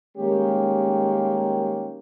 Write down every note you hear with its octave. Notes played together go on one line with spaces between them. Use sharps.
D#3 G3 G#3 A#3 C#4 G4